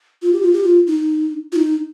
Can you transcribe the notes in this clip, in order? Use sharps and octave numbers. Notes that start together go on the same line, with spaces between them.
F4
G4
F4
G4
F4
D#4
F4
D#4